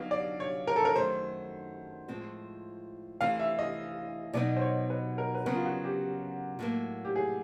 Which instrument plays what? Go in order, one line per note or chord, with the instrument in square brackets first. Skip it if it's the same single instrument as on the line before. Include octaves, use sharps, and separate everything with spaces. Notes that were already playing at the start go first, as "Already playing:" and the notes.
Already playing: [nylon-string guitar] D3 F#3 B3 D#4 [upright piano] F5
[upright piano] D5
C#5
A#4
A4
A#4
[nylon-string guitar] F#2 D#3 F#3 A3 [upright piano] C5
[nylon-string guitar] A2 F3 G#3 C4
[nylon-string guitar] E3 A3 C4 [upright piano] F5
[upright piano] E5
D#5
[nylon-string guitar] B2 F#3 B3 D#4 [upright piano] D5
[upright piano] C5
C#5
B4
A#4
B4
[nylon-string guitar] C#3 F#3 B3 [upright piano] A#4
[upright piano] F4
F#4
G4
[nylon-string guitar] A2 F#3 A#3
[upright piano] G4
G#4